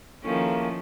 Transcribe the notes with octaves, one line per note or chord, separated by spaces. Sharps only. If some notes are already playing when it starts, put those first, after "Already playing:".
D#3 F3 A#3 C#4 E4 G#4 A4